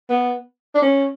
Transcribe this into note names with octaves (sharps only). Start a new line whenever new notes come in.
B3
D4
C#4